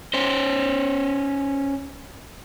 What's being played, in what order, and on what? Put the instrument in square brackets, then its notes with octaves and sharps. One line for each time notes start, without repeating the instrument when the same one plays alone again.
[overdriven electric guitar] C#4 C5